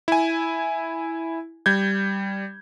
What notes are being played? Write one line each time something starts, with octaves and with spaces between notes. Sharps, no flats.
E4 G#5
G3 G6 G#6